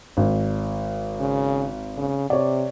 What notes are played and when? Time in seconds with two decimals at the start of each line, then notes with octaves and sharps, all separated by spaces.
0.17 G#1
1.20 C#3
1.97 C#3
2.30 C3 C#5 D5